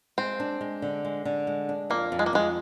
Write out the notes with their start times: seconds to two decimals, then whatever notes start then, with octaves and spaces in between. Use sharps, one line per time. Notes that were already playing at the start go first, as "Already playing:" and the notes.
0.18 G#3 C4
0.40 D4
0.61 G#3
0.82 D3
1.05 G#3
1.25 D3
1.47 G#3
1.69 D4
1.90 F2 A#3
2.12 F2
2.19 G#3
2.26 A#3
2.33 F2 G#3